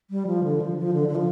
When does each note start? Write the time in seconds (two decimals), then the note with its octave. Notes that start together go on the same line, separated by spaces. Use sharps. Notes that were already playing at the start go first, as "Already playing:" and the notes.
0.10 G3
0.27 F3
0.44 D3
0.60 F3
0.77 F3
0.93 D3
1.08 D3
1.15 F3